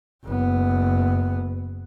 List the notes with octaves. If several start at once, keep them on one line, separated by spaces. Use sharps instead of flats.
F#1 B3